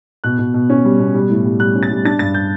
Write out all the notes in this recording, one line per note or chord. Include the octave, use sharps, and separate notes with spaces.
B2 F#6
B2
B2
C#4
G3
B2
G3
A2
G3
G3 F#6
C#4
A6
G3
D4 A6
G2 A6
G6